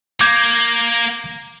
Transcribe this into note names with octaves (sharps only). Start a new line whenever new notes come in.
A#3 D6 G6 G#6